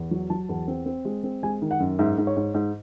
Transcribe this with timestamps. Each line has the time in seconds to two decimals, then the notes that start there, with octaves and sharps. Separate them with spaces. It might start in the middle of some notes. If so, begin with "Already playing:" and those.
Already playing: E2
0.11 F#3
0.30 F#3 A5
0.49 E2
0.68 C4
0.86 C4
1.05 G#3
1.24 C4
1.43 G#3 G#5
1.62 D#3
1.71 F#5
1.80 F#2
1.99 G#2 E5
2.18 G#2
2.27 C#5
2.37 G#2
2.54 G#2